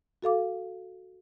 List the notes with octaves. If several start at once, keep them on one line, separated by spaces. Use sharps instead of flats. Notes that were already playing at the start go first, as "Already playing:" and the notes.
F#4 A4 F5 D6